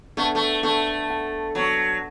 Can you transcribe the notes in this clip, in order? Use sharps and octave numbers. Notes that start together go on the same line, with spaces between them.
A3 B3 D4 A4 F#5 A5
A3
A3 B3 D4 A4 F#5 A5
B3 D4 A4 F#5 A5
F#3 B3 D4 A4 F#5 A5